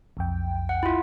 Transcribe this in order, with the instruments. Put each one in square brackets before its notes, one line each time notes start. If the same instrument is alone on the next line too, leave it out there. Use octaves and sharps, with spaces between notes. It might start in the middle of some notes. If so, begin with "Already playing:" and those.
[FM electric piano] B1 F2 G5
[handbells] F#5
E4 F4